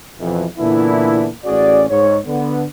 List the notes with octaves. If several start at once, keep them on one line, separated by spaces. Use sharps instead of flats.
F2 B2 E3
A#2 D3 E3 B3 D4 E4
A1 C#4 F#4 G#4 D5
G#2 C#5
D3 B3